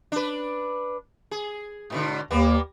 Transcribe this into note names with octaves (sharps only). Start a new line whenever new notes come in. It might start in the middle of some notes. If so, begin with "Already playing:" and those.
D4 B4
G#4
G#2 B2 D3
D#2 G3 A#3 B3